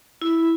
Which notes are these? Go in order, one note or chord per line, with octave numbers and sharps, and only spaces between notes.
E4